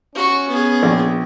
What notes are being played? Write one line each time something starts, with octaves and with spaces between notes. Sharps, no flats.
C#4 F#4 C#6
B3 G#4
A#1